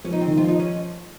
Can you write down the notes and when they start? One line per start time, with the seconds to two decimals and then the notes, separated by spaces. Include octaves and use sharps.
0.04 F3 C#4
0.13 D#4
0.21 C4
0.27 D#3
0.37 F3 F4
0.48 D#4
0.59 C#4